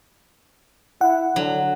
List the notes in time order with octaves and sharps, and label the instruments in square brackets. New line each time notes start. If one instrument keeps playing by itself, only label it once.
[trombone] E4 [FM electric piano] F#5
[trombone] D3 [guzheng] F#3